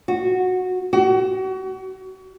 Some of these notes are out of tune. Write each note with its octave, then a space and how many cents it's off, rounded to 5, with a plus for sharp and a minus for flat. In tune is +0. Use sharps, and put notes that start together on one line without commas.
F#4 -10
F#4 +35